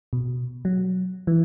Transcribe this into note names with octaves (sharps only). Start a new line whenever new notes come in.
B2
F#3
E3